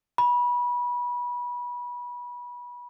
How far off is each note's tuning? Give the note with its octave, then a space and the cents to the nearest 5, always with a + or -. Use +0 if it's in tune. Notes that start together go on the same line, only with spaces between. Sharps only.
B5 -25